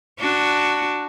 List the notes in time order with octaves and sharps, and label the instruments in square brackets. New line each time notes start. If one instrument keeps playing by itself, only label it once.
[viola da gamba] D4 F#4